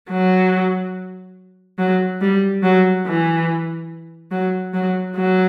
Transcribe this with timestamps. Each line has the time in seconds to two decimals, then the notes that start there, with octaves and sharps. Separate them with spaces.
0.09 F#3
1.79 F#3
2.21 G3
2.63 F#3
3.05 E3
4.31 F#3
4.74 F#3
5.16 F#3